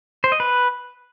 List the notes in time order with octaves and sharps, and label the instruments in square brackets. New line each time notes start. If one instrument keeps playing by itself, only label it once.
[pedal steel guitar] C5
D#5
B4